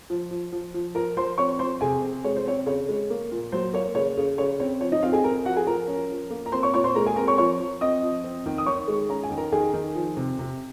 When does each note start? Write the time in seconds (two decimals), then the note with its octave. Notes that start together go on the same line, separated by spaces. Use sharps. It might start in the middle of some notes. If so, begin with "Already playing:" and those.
0.10 F3
0.31 F3
0.52 F3
0.74 F3
0.95 F3 A#4 A#5
1.17 F3 C5 C6
1.38 C4 C#5 C#6
1.59 F3 C5 C6
1.81 C3 G#4 G#5
2.02 C4
2.24 G#3 C#5
2.36 C5
2.46 C4 C#5
2.66 C#3 C#5
2.88 G#3
3.10 A#3
3.32 A#2
3.52 F#3 C5
3.73 A#3 C#5
3.95 C#3 C#5
4.17 C#3
4.38 C#3 C#5
4.60 C4 C#5
4.81 F3 C#5
4.92 D#4 D#5
5.03 C4 F4 F5
5.13 G#4 G#5
5.24 C4 A#4 A#5
5.45 F3 F#4 F#5
5.56 G#4 G#5
5.67 F3 A#4 A#5
5.88 C#4
6.10 F3
6.30 A#3
6.46 A#5
6.52 C4 C5 C6
6.63 C#5 C#6
6.74 A#2 C#5 C#6
6.84 C5 C6
6.95 G#3 A#4 A#5
7.06 G#4 G#5
7.16 C4 A#4 A#5
7.28 C#5 C#6
7.38 F3 C#5 C#6
7.60 F3
7.81 C4 D#5 D#6
8.02 F3
8.24 C4
8.46 D#3
8.58 D#6
8.66 D#3 C#5 C#6
8.88 G#3
9.09 C#4 A#5
9.23 G#5
9.30 D#3
9.37 A#4 A#5
9.52 D#3 G#4 G#5
9.74 D#3
9.95 F3
10.17 C3
10.39 C3